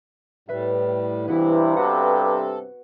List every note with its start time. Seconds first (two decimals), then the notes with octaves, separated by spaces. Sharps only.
0.49 A2 G3 B4 E5
1.28 G2 C3 E3 B3 E4 F#4
1.77 F#4 A4 B4 F#5